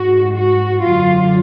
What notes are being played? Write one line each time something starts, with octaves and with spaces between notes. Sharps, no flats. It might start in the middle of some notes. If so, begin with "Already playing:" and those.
Already playing: G#2 F#4
F#4
F#2 D3 F4